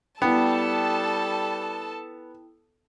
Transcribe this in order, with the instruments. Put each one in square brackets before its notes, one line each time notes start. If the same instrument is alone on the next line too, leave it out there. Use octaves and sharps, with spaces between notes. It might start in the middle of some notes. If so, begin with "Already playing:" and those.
[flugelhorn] G3 [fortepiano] B3 [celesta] E4 G5 [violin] A4 A5